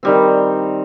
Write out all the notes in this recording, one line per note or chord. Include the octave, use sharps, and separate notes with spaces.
D#3 G3 C4